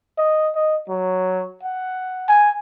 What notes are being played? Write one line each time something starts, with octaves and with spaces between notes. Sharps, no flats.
D#5
D#5
F#3
F#5
G#5